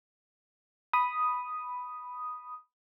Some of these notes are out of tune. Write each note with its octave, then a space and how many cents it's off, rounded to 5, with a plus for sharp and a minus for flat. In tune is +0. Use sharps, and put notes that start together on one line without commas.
B5 +0 D#6 +0